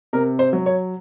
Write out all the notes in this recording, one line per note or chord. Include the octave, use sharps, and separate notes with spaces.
C3 A#4
C5
F#3
C#5